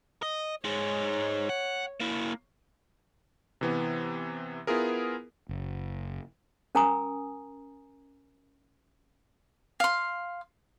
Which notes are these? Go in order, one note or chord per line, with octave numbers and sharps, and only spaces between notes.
D#5
G#2 G#3 C#5
F#5
A#3 E4
C3 E3 B3
B3 E4 F4 G#4 A#4
F#1
C#4 A#4 G#5 A#5 D#6
F5 C6